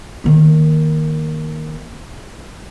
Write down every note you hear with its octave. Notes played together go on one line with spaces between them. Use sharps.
D#3 A#3